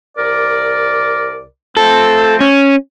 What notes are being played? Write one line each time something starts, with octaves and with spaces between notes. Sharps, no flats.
C2 A#4 D5
F3 A3 C4 A4
C#4